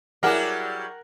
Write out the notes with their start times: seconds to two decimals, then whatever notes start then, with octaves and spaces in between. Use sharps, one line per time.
0.23 F#3 G3 E4 G4 G#4 A#4 D5 F#5